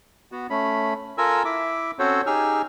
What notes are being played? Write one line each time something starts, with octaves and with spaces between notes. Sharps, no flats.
B3 F#4
A3 C#4 B5
F4 A4 A#4 G#5 E6
E4 E5 D6
C4 C#4 F#4 A4 C5 C#5
D#4 G4 G#4 G#5 E6 F6